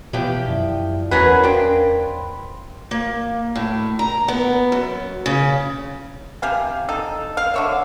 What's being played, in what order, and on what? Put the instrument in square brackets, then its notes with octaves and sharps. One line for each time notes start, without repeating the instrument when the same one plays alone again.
[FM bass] B2 [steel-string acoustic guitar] E3 F3 G4
[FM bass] F#2 [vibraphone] D5 E5 G5
[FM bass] E2 [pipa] F#3 G#4 B4 [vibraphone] C#4 A#4 F#5 [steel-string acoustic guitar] F#4
[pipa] F3 D4 [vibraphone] A#4 [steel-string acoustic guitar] G5
[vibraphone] B5 C6
[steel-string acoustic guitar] A#3
A2
A#5
B3
F#2
C#3
[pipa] C3 G4 F5 G#5
D#4 A4
F5
D3 C#5 E5